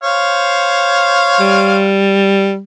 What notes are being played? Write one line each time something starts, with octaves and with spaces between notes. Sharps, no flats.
C5 C#5 F5
G3